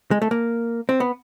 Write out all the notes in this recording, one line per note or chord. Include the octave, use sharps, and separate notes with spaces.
G#3
A3
A#3
C4
B3